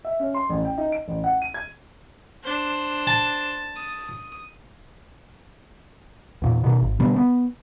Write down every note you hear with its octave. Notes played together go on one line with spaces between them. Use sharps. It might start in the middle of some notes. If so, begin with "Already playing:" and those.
E5
C#4
C6
A1
G5
D#4
D7
A1
F#5
D#7
G#6
D4 C5
A5
D#6
E2 A#2
B2 D#3
G#1
B2 D3 G3 B3
B3